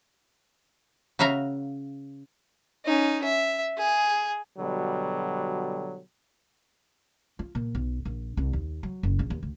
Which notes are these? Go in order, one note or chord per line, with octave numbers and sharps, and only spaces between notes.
C#3 F#4 E5 F5 A#5
C#4 D#4
E5
G#4
B2 D3 F#3 G3
F4
A#2
B1
A#1
C2
D#2
F#3
F#1
A#1
D#2
D2